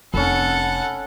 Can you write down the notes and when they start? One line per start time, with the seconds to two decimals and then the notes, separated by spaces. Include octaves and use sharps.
0.14 F1 C#4 A4 F#5 B5